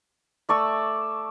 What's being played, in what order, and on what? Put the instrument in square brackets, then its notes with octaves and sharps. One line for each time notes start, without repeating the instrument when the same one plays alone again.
[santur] A3 D5 C#6 E6